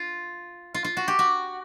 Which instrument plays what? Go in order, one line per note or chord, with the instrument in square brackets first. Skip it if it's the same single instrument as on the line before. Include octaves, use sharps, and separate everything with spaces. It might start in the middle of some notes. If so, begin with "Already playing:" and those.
Already playing: [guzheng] F4
F4
F4
F#4
G4
F#4